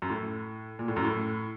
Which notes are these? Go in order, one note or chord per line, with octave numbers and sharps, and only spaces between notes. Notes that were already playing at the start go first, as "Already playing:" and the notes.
F#2
A2
A#2
A2
F#2
A2